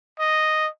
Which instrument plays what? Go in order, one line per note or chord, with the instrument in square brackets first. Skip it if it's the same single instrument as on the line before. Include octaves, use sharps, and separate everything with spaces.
[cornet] D#5